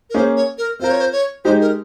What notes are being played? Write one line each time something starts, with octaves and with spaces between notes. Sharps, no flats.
A#4
A#3 C#4 G#4 C5
C#5
A#4
C4 F4 A#4 C5
C#5
C5
C#5
G#3 D#4 G4 C5
A#4